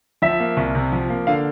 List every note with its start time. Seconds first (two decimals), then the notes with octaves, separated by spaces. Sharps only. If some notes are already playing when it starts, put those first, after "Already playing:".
0.22 F3 E5
0.40 A#3
0.57 C2
0.75 C3
0.92 F3
1.10 A#3
1.27 D3 F5